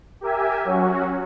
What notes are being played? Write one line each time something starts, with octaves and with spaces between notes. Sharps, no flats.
G4 A#4 E5 G#5
F#3 C#4 F#4